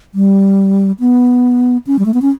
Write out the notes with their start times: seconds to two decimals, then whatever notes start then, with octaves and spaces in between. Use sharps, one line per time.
0.14 G3
1.00 B3
1.87 C#4
1.99 G3
2.06 A3
2.14 B3
2.22 C#4